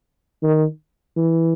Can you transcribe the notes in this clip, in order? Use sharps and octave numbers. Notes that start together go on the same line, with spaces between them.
D#3
E3